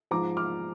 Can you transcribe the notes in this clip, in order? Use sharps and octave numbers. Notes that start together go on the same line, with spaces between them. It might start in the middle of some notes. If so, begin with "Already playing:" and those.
G#2 F3 A#5 D6
D6 F6